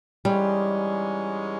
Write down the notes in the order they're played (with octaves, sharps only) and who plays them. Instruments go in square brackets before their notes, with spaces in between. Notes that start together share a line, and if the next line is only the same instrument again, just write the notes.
[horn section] G#2 E3 G#3 C#4 [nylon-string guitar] G3